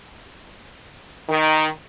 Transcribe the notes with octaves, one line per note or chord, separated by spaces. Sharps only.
D#3